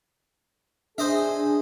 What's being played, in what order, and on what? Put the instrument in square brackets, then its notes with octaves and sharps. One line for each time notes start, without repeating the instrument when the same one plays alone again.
[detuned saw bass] D4 [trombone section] G#4 [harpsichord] C5 D#5 E5